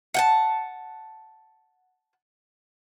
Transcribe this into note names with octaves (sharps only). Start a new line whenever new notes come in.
F#5 G5 A5